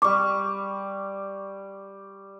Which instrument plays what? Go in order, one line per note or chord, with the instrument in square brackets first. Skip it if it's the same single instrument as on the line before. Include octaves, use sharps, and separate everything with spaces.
[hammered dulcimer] G3 C#6 [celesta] D6